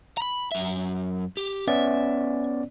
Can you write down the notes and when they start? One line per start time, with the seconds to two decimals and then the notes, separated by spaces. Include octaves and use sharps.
0.17 A#5 B5
0.52 F#2 E5
1.37 G4
1.68 B3 C#4 D5 E5